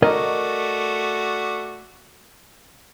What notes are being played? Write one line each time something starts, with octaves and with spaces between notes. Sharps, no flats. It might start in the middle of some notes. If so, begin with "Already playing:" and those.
A3 F#4 A#4 D5 D#5